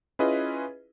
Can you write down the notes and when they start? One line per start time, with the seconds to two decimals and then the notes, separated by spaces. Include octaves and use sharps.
0.19 C#4 E4 F4 G#4 B4 D#5